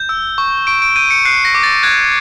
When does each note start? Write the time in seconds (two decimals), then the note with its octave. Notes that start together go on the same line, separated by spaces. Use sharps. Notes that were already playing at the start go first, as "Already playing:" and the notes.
Already playing: G6
0.09 E6
0.38 C#6
0.67 C#6 D7
0.82 D7
0.96 G6 D#7
1.10 C#7
1.25 F#6 C7
1.45 A#6
1.55 D6
1.63 A6
1.83 F#6 G#6